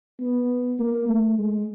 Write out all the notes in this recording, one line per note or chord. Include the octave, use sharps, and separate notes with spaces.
B3
A#3
A3
G#3